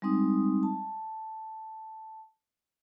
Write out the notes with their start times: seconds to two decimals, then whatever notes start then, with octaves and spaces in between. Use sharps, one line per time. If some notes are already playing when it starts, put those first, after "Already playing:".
0.02 G3 G#3 C4 D#4 D#6
0.63 A5